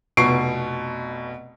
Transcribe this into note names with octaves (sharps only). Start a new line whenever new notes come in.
F1 B2 C#6 C7 D7